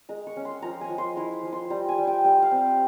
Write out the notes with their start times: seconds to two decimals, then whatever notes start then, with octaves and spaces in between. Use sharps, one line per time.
0.09 G#3 A#5
0.27 C#6
0.36 C#4
0.45 C6
0.62 F3 A#5
0.81 G#5
0.90 F3
0.98 C6
1.16 E4 A#5
1.43 F3
1.52 C6
1.70 G3 A#5
1.89 G#5
1.98 G3
2.07 G5
2.24 G3 G5
2.42 F5
2.51 C4